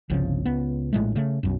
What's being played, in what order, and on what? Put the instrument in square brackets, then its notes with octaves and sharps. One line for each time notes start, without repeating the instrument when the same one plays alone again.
[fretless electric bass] G1 C2 C#3 F3
C#2 B3
A#1 A2 G#3 A3
C#3 A3
B1 F#2